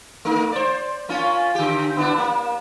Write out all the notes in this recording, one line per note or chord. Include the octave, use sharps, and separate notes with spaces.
A3 D#4
C5 D5
A#3 C#4 F4
D3 G4
B3 D4 E4
A#3